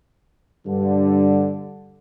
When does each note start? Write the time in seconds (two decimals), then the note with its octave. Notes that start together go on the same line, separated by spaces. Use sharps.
0.67 G2 D3